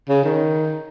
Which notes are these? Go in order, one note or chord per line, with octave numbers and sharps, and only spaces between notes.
C#3
D#3